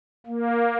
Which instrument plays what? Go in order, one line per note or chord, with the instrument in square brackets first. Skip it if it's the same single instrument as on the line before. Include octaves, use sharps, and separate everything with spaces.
[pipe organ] A#3